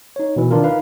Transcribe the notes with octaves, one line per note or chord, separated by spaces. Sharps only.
D#4 C#5
B2 E3
D#3 D4 F4 A#4
D#4 A#4 B4 F5